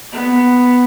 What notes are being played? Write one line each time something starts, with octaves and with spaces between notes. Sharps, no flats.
B3